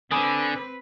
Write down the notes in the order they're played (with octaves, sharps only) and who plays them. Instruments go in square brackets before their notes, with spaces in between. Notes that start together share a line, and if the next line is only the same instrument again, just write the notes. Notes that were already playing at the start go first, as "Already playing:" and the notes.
[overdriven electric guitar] D3 [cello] C4 B4 [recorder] G#5 [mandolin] B5 D6 D#6